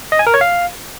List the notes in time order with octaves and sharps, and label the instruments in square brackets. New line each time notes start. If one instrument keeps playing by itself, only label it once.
[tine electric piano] D#5
G#5
A#4
C#5
F5